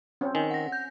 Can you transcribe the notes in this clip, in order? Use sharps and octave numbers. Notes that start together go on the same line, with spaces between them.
C4 C#4
D#3 G#5
F#5 A#6
G6